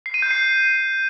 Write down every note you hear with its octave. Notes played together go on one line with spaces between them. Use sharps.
C7
D#7
G6
C7